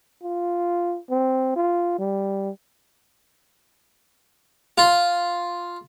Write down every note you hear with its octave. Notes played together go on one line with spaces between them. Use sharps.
F4
C4
F4
G3
F4